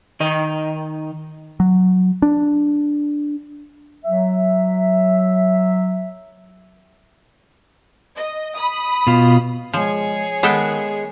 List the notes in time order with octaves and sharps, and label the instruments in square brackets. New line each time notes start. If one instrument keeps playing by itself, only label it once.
[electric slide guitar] D#3 D#5
[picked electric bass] F#3
D4
[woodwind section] F#3 E5
[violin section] D#5
B5 D#6
[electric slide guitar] B2 F4
[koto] F3 [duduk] G#3 [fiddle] G#4 C#5
[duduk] D#3 [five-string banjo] G#3 [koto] B3 A4 G5